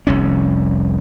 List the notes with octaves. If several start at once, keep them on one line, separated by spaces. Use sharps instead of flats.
F1 C2 C#4